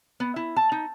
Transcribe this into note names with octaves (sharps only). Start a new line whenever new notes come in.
B3
E4
A5
D#4